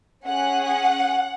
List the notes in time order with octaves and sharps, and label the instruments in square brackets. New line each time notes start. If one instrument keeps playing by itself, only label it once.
[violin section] C#4 G#4 F#5